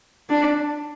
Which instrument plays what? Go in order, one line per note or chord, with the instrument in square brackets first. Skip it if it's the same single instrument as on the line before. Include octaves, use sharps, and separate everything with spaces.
[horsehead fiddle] D4